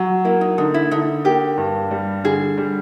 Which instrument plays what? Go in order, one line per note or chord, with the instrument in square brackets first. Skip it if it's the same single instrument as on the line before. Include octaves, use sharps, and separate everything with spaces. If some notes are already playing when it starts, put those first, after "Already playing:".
Already playing: [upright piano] F#3
[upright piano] A#3 [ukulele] E4
[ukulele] D#4
[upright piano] D3 [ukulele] D#4
[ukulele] E4
[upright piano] D3 [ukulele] D#4
[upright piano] A#3 [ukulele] G4
[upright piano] G2
G3
[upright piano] D3 [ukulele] G#4
[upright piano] G3